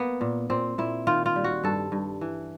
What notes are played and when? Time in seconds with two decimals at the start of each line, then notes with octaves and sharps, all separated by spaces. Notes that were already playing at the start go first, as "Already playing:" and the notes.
Already playing: A#3 B3
0.21 A#2
0.50 A#2 C4
0.78 A#2 E4
1.07 D#3 F4
1.26 F4
1.36 G3
1.44 F#4
1.64 G2 A4
1.92 G2
2.21 E3